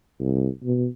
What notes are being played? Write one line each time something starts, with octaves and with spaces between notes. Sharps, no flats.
C2
B2